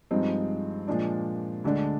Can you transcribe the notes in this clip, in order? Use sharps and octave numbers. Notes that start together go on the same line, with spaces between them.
G2 F3 G#3 C4 D#4
A#2 F3 G#3 D4
D2 D3 G#3 D4